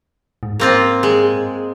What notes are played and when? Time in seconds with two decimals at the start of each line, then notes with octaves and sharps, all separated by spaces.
0.43 G#2
0.60 A#3 C4 F4
1.03 G#3